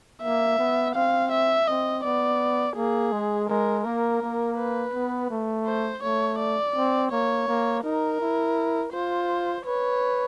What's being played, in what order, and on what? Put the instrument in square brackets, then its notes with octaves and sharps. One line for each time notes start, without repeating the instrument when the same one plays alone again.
[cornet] A#3 [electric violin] E5
[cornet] B3
[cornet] C4 [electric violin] F5
[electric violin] E5
[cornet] C4 [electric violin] D#5
[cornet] B3 [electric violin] D5
[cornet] A#3 [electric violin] G#4
[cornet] G#3
[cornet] G#3 [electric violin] A#4
[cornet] A#3 [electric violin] A#4
[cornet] A#3
[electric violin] B4
[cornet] B3
A3
[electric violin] C5
[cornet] A3 [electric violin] C#5
[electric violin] D5
[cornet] C4
[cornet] A#3 [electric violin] C#5
[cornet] A#3
[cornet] D#4 [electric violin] A#4
[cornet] E4
[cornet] F4 [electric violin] C5
[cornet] B4 [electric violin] C#5